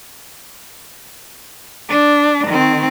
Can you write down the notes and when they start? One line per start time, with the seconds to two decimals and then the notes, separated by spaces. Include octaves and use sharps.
1.89 D4
2.48 D#3 C4